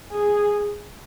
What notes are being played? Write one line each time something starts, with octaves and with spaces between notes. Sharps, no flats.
G#4